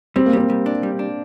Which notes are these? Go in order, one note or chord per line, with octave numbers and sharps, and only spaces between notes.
G3 C4
A#3
G3 C4
G3
D4
G3
D4